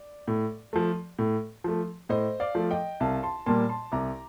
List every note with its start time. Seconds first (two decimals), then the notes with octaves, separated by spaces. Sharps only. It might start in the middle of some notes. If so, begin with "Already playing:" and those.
Already playing: D5
0.28 A2
0.73 F3 A3
1.19 A2
1.64 F3 A3
2.09 A2 C5 D#5
2.40 D5 F5
2.55 F3 A3
2.71 D#5 G5
3.00 C2 F5 A5
3.23 A5 C6
3.46 A#2 G3 A#3 A5 C6
3.69 A5 C6
3.92 C2 A#5 D6